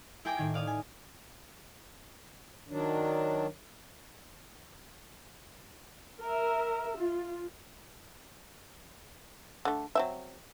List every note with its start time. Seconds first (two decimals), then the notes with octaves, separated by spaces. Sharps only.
0.25 E4 G#4 A#4 G5 G#5 D6
0.37 A2 D#3 G#6
0.54 D5 F5 D#6
0.67 G#5
2.69 D#3 F#3 D4
6.21 A#4 E5
6.97 F4
9.65 D3 A3
9.95 F#3 C4 E5